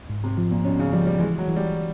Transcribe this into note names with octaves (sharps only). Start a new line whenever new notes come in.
G#2
C3
F3
A#2
B2 C#4
C#3
F3 G3
G3
E3 G#3
F#3
E3
G3